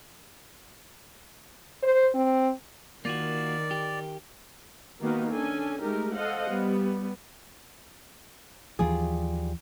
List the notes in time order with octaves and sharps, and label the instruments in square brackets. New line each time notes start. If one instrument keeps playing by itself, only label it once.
[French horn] C5
C4
[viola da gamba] D#3 [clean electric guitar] A#3 F4 F#4 [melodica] D5
[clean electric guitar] G4
[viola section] D#3 A#3 B3 D#4 F#4 A#4
C#4 D4 A4 G#5
G#3 A3 D#4 G4 G#4 A#4
A4 C5 D#5 F5 F#5
G3 B3
[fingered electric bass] D#2 E3 F3 [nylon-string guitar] G3 F4 G#4